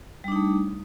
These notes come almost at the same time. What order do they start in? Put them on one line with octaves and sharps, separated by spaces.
G3 D4 D#4 A3